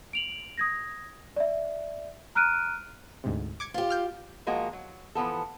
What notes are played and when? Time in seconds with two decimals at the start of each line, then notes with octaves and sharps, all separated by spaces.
0.13 D7 F7 F#7
0.58 D#6 G#6 A#6
1.36 D5 E5
2.35 A#5 F6 F#6 D7 D#7
3.24 D2 G#2 C3
3.60 D6 G#6 C#7
3.74 F4 G4
3.90 F6 G6
4.47 F3 G#3 A#3 F#4
4.73 F#3
5.15 E3 F3 B3 A4